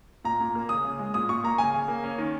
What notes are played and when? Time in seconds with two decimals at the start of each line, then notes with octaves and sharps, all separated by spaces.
0.24 A#2 A#5
0.40 A#2
0.55 A#3
0.69 C#3 D#6
0.85 C#3
0.99 G#3
1.14 A#2 D#6
1.29 A#2 C#6
1.44 A#3 A#5
1.58 C#3 G#5
1.74 C#3
1.88 A#3
2.04 C#4
2.18 D#3